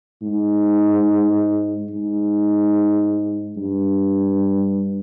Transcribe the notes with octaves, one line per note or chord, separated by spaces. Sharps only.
G#2
G#2
G2